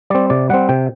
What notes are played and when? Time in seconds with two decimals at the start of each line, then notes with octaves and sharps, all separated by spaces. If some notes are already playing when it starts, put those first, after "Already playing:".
0.10 G3 C4 D5
0.30 C3 D5
0.49 G3 C4 F#5
0.69 C3 G5